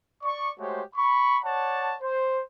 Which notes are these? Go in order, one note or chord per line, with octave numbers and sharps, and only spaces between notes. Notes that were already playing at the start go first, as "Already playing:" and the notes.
D5 C#6
G#3 A3 F#4 G4 C5 C#5
B5 C#6
C#5 D5 F#5 A5
C5